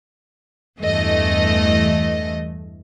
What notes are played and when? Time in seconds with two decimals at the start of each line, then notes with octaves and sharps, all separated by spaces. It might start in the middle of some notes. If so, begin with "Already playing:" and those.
0.78 E2 G2 E3 A3 D#5